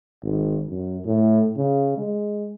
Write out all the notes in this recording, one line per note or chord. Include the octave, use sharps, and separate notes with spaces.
G#1
F#2
A2
C#3
G#3